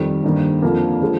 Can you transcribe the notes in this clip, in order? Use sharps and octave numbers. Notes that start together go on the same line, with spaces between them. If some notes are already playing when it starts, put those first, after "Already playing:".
Already playing: F2 D#3 G3
G2 D#3 A#3
F2 D3 F3 A#3
D3 F3 G#3